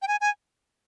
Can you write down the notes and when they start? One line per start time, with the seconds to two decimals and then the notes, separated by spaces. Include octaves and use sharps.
0.02 G5
0.08 G#5
0.21 G#5